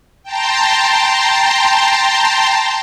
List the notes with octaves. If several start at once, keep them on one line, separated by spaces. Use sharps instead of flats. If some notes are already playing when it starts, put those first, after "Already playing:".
G5 A5 A#5 C6